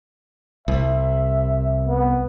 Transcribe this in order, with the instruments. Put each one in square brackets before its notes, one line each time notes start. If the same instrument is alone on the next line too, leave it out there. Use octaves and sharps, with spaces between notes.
[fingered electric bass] C2 [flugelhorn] E5
[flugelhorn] B3